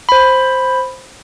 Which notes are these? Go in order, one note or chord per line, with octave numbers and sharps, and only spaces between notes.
C5 B5